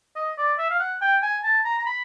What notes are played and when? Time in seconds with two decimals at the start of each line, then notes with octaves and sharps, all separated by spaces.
0.16 D#5
0.38 D5
0.59 E5
0.70 F5
0.79 F#5
1.01 G5
1.23 G#5
1.44 A5
1.64 A#5
1.79 A#5
1.86 B5